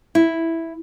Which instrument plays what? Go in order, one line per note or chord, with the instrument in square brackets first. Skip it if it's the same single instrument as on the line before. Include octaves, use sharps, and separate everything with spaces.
[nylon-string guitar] E4